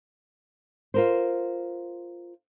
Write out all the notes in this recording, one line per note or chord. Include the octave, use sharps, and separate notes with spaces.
F4 A#4 C5